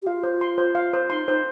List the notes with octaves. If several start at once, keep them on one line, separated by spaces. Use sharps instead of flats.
G4
F4 F5
C5
C6
C5
F5
C5
D#4 C6
D#4 C5